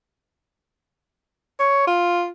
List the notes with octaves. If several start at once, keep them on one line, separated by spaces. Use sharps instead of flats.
C#5
F4